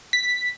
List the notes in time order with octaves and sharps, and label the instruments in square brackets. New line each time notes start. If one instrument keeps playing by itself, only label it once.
[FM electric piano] B6